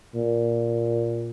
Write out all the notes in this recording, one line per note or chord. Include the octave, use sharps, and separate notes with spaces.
A#2